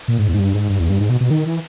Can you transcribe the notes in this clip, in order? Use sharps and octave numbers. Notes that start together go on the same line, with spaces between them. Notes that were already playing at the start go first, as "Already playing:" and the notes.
A#2
G#2
E2
G#2
G2
G#2
G2
E2
G2
G#2
B2
B2
D#3
E3